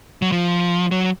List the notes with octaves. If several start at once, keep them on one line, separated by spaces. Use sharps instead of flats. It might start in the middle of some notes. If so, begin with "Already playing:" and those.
F#3
F3
F#3